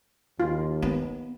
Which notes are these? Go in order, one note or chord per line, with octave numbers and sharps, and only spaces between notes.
D#2 F4
B3